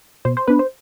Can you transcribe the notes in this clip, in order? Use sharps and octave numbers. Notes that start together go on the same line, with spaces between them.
B2 C5
C5
B3 D4 B4
C5